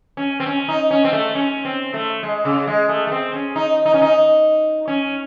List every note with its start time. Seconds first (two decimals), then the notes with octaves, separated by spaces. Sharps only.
0.17 C#4
0.40 C4
0.46 C#4
0.69 D#4
0.91 C#4
1.04 C4
1.13 A3
1.35 C#4
1.65 C4
1.94 A3
2.23 G#3
2.45 C#3
2.67 G#3
2.89 A3
3.07 A3
3.12 C4
3.33 C#4
3.56 D#4
3.86 D#4
3.94 C#4
4.02 D#4
4.88 C#4